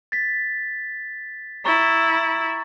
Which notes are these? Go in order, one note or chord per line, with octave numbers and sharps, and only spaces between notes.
A6 B6
E4 A#5 C#6 A6